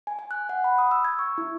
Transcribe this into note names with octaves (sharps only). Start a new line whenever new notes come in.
G#5
G#5
F#6
F#5
B5
D#6
E6
G#6
C#6
E4